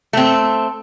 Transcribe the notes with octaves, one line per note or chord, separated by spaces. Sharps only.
A3 C4